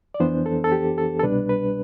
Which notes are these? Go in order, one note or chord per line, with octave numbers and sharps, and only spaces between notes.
D5
F2 E3 B3 D4 C5
A4
A4
G4
A4
A4
C2 B2 G3 D4 B4
B4